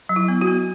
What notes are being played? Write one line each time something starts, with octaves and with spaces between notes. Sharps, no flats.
F#3
E4
B3
F#4
B3